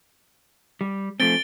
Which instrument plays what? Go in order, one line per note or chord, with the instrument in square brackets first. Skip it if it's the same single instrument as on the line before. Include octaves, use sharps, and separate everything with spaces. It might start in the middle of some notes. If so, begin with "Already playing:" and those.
[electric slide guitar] G3
[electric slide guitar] F3 A3 C4 [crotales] A6 D7 G7